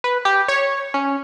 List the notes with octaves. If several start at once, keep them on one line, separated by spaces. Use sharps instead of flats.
B4
G4
C#5
C#4